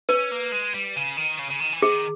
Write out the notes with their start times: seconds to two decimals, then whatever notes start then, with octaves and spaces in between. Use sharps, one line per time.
0.09 C#4 B4
0.31 A#3
0.52 G#3
0.74 G3
0.96 C#3
1.17 D#3
1.39 C#3
1.50 C#3
1.60 D#3
1.73 E3
1.82 D#3 G#4